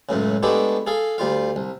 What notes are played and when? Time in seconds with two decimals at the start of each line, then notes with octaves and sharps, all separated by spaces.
0.09 C#2 F#2 A2 C#3
0.43 G#3 A3 B3 D4 E4 G4
0.87 G#4 A4 F5
1.18 D2 G3 F4 F5
1.56 C2